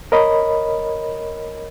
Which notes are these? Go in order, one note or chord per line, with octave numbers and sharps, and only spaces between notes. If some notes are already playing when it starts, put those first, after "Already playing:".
A#4 C#5 D#5 B5